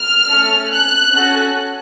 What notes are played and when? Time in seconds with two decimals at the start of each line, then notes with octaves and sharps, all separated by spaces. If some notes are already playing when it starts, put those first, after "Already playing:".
Already playing: F6
0.29 A3 C#4 A4
0.71 F#6
1.13 C#4 F#4 A4